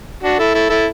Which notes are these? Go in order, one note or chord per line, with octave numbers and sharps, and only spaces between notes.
D4 F#4
E4 A4
E4 A4
E4 A4